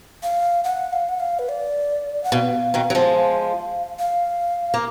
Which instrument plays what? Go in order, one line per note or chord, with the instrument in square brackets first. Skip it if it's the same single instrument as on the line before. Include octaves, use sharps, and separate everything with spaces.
[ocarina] F5
F#5
F5
F#5
F5
B4
D5
F#5
[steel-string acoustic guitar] B2 [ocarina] F5
[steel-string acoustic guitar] B2 D#3
F#3
F3 G#3
[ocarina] F5
[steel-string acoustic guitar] A#3